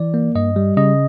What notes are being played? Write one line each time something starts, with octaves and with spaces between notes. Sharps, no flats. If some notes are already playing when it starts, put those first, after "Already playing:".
Already playing: E3 D5
A#3
G2 D#5
G3
C#3 D#5